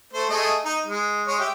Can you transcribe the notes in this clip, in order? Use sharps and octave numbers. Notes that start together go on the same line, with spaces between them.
A3 C5
A3 G#4 D#5
D#4
G#3
G#3 C#5
G4 E5